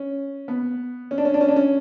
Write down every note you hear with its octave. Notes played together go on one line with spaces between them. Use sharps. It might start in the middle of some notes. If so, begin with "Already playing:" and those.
Already playing: C#4
B3
C#4
D4
C#4
D4
C#4
D4
C#4